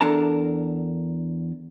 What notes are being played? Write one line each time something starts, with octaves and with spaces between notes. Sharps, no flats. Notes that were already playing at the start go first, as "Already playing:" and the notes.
E2 D4 A4 A#4 A5 A#5